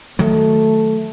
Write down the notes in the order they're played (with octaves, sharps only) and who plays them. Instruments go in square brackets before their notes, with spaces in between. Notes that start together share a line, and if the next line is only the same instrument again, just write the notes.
[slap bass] D#3 F#3 [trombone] A3